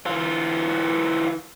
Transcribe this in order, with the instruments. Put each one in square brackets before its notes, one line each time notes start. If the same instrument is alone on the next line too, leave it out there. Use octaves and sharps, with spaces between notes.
[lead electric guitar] E3 F4